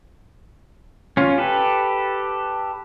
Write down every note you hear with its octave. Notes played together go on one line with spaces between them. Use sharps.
C#4 F4
G4 A4 B4